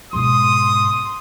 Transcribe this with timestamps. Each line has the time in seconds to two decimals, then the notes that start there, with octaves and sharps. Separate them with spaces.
0.13 G#2 B2 C6 D#6